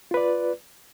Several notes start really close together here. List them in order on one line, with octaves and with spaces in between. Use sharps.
F4 B4 D5